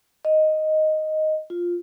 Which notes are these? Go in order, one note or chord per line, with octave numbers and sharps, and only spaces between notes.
D#5
F4